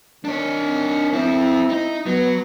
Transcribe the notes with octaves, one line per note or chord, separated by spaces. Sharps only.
D#3 D4 C#5
F2 C4 E4
D#4
F#3 B3